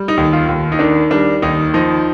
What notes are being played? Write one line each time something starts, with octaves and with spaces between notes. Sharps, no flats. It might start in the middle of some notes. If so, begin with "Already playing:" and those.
Already playing: G3
D#4
D#2
F4
D#2
D#4
D#3 D4
G3 D4
D#2 D#4
F3 D#4